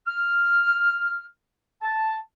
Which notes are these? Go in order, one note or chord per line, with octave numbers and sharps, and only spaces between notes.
F6
A5